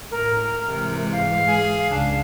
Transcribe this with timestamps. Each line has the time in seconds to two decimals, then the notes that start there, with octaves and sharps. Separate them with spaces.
0.11 A2 A#4
0.66 G#2 C3 E3 G#3
1.12 F5
1.48 G#4
1.90 C#2 D4